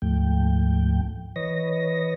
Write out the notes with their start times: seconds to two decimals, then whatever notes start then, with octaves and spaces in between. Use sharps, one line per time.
0.02 D2 G#2 F3 A3 G5
1.36 E3 B4 C#5 D#5 A#6